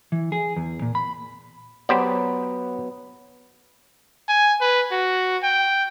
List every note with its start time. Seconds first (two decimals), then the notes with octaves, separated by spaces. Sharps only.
0.12 E3
0.32 G#4
0.56 E2
0.82 A#2
0.95 B5
1.89 F#3 B3 G4 C5 D5
4.29 G#5
4.61 B4
4.92 F#4
5.43 G5